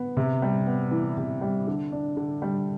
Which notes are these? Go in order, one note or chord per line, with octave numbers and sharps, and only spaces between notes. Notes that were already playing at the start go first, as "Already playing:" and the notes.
Already playing: B3
C3
G3
B3
E3
C3
G3
D3
D4
D3
G3